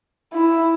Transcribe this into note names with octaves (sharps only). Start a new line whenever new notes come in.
E4